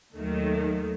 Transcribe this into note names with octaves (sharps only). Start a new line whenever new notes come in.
D#2 D#3 F#3 A3